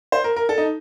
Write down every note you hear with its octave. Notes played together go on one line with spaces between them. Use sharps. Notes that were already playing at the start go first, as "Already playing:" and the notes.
C5
A#4
A#4
A4
D#4